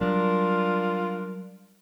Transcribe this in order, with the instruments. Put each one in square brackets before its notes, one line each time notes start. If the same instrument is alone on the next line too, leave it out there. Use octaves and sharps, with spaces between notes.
[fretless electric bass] F#3 G3 [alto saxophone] D4 [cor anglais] F4 [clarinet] A#4